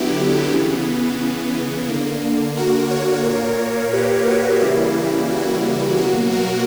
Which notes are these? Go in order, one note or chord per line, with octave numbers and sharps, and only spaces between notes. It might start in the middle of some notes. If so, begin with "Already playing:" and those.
Already playing: D3 F#3 B3 E4 G4
C#3 E3 B3
D3 A#3
F#4 A#4
A#4 C#5
A#2 A#3
G4 B4
F#4
C#3 E3 G3 A#3 E4
E4
F#4
B2 F#3 A#3 F#4
F#4 A#4